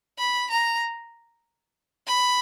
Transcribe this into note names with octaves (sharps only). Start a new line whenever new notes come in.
B5
A#5
B5